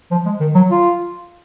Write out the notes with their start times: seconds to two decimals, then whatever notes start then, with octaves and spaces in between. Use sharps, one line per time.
0.11 F3
0.26 G#3
0.40 D#3
0.55 F#3
0.71 F4